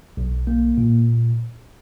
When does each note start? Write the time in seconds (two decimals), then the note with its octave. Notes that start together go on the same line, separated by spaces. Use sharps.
0.17 B1
0.47 A#3
0.77 A#2